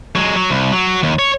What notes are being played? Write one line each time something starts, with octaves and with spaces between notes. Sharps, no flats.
F#3 G#3
F#3
C2
F#3
D#2
C#5